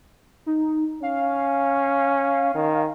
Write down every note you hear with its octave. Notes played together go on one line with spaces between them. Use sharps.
D#4
C#4 F5
D#3